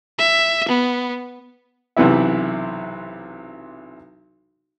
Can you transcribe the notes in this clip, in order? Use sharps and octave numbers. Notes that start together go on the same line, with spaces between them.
E5
B3
B1 C3 E3 B3 E4 E5